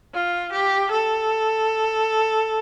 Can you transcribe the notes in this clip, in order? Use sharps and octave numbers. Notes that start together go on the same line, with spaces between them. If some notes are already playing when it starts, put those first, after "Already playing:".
F4
G4
A4